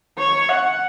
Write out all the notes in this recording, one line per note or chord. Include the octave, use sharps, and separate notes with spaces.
C#5
F#5